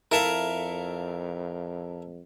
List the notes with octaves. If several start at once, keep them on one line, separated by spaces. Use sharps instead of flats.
F2 E4 A4 A#4 E5 F5